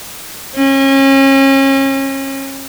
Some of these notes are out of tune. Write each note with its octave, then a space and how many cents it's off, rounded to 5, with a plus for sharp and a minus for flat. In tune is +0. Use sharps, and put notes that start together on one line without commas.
C#4 -35